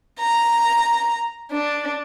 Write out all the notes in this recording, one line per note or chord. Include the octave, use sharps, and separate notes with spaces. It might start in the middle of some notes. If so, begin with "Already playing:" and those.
A#5
D4